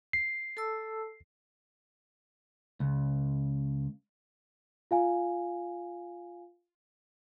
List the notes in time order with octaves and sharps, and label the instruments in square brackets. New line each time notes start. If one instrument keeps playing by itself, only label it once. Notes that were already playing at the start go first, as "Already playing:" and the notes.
[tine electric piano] C7
[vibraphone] A4 A5 E6
[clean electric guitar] C#2
[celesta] F4 F5 G#5